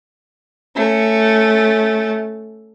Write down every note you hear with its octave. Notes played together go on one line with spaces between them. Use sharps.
A3 C#4